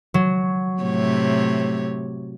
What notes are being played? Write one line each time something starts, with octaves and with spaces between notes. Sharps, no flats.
F#3
A2 C3 C#5